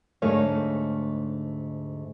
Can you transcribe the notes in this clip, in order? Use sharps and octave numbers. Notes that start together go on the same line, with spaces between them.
D2 G#2 A3 D#4 C#5 F5